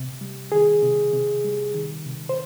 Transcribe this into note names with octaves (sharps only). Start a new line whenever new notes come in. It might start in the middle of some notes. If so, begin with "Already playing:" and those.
Already playing: C3
G3
D#3 G#4
C3
C3
G3
D#3
C3
C5